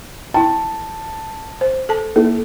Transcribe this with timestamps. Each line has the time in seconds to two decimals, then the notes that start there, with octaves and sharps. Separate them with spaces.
0.34 E4 G5 A5
1.61 C5
1.89 A4 A5
2.16 A#3 E4 A4